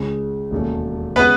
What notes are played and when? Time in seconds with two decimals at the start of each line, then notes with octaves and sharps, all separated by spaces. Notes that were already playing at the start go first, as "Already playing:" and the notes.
Already playing: C#2 C#3 G#3 C#4 G#4
0.51 E1 D#2 D#3 A3 C#4
1.16 C#3 G#3 B3 C#4 B4